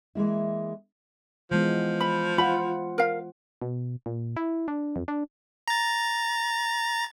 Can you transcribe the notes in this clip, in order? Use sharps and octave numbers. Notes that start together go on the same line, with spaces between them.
E3 G#3 A#3 E4
E3 F3 G#3 B3
B5
F4 C5 F#5 B5
A#4 F5
B2
A#2
E4
D4
F2
D4
A#5 A6